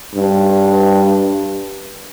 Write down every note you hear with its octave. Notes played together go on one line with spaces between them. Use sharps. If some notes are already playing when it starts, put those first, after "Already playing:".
G2